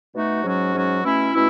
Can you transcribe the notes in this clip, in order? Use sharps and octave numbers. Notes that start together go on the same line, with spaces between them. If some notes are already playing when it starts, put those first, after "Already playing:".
B2 A3 D#4 F#4
G#2 F#3 C#4 F#4
G#2 F#3 C#4 F#4
B2 A3 C#4 E4
B2 A3 C#4 E4